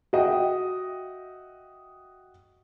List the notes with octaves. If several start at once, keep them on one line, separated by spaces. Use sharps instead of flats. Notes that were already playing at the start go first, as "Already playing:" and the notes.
F#4 D#5 E5 G5